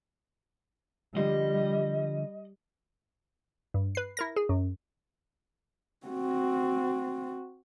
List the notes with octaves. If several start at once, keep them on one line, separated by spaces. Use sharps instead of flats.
D3 F3 G3 D#5
G2
B4 C7
E4 A#4 A#6
G#4
F#2
C4 F#4